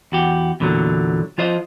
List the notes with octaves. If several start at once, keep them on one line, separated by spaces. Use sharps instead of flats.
E2 F#4 G4
E2 A#2 D3 F#3
F3 F4 C5 D#5